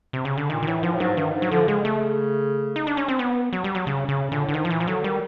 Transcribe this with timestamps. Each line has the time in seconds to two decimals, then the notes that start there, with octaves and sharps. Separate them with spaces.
0.13 C3
0.25 C#3
0.38 D3
0.50 A#2 D#3
0.62 D#3
0.67 A2 E3
0.83 G#2 F3
0.94 A2
1.00 G#2 F#3
1.17 G2 D#3
1.34 G#2
1.42 F#3
1.51 D3 F3
1.68 C#3 G#3
1.85 A3
2.76 D#4
2.87 D4
2.97 C#4
3.08 C4
3.19 B3
3.53 F#3
3.64 G3
3.75 F#3
3.87 C#3
4.09 C#3
4.30 A#2 D3
4.42 A2
4.49 D3
4.54 G#2 D#3
4.65 F3
4.70 A#2 E3
4.80 F3
4.87 D3 F#3
5.04 D#3 G3